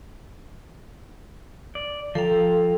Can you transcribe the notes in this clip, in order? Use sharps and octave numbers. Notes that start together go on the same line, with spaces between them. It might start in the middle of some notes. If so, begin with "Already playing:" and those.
D5
F3 A4 G5 A#5